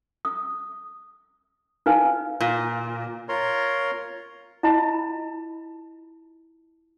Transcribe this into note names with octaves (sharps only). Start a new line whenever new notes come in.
D#6
D#4 E4 B4 F5 G#5
A#2
F4 A#4 C#5 A#5 C6
E4 F4 D#5 A5 A#5